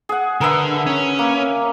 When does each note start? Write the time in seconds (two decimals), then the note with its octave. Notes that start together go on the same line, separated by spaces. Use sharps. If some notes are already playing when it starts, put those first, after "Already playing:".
0.09 G#4 F#5
0.41 D3 A#4 B4 E5
0.87 C#4
1.19 A#3